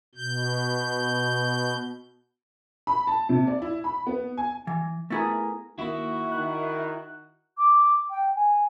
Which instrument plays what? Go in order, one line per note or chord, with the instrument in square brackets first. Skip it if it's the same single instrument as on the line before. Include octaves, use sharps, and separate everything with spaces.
[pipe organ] B2 G6
[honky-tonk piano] B5
A5
C3
D5
E4
B5
B3
G#5
[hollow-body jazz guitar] E3
A3 B3 E4 G#4 A#4
[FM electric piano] D#3 A#3 [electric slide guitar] E4 [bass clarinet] F#4
[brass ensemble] D#3 [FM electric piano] F#6
[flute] D6
G5
G#5